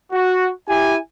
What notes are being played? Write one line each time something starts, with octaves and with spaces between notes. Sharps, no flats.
F#4
E4 G4 G#5